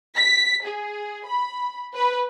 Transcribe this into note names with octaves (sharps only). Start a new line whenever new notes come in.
B6
G#4
B5
B4